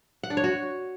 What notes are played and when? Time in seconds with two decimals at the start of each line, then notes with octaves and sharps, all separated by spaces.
0.23 F#5
0.30 D4
0.37 C#5
0.44 F#4